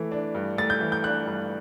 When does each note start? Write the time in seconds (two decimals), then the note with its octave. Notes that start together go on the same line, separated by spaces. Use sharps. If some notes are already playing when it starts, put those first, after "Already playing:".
Already playing: E3 A3
0.12 D4
0.35 G2
0.58 A3 A6
0.70 G6
0.81 E3
0.92 G6
1.04 D4 F#6
1.27 G2